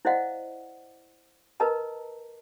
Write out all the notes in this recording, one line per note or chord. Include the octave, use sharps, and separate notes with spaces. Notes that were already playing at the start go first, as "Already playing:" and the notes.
E4 C5 D5 D#5 F5 F#5
A#4 B4 D#5 A5 A#5